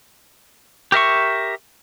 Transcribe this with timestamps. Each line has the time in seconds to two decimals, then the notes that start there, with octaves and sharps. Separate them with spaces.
0.92 G4 A#4 E5 C#6